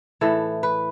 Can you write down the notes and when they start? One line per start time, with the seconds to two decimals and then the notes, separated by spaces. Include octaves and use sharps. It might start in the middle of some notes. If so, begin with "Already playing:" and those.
0.21 A2 E3 A4
0.63 B4